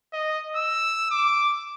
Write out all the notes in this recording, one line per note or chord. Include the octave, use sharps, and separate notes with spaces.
D#5
E6
D6